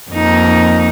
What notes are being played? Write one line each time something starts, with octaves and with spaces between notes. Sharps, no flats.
F2 A#3 D#4